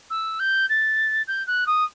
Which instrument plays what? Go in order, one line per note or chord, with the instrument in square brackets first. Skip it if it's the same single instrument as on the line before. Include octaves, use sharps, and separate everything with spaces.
[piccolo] E6
G6
A6
G6
F#6
D#6